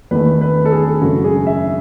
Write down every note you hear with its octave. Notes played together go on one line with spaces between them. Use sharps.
E2 D#3 A3 B4
B4
A4
G#4
F#2 C#3 G#3 F#4
G#4
E5